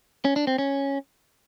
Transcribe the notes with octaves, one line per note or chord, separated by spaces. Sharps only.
C#4
D4
C4
C#4